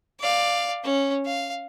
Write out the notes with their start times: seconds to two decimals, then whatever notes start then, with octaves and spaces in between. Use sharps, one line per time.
0.20 D5 F5
0.83 C#4
1.26 F5